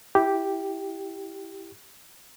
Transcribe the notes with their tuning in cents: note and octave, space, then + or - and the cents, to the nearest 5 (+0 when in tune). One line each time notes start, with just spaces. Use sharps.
E4 +0 G4 +0